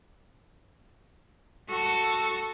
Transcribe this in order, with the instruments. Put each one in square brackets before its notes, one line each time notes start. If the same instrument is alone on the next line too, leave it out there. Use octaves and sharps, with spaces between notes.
[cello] F#4 A4